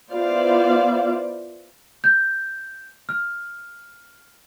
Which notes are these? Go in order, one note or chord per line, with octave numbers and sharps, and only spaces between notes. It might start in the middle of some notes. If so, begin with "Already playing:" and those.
B3 E4 F4 C5 D5 F5
G6
F6